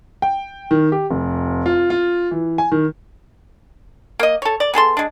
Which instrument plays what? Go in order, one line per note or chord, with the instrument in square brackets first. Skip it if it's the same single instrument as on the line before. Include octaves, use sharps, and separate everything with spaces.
[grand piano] G5
D#3
G4
F1
F4
F4
E3
G#5
D#3
[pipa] A#3 D#5
A4 C#5
D5
B3 G#4 A4 C6
G#3 D4